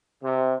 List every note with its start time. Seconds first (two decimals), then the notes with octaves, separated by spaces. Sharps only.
0.23 C3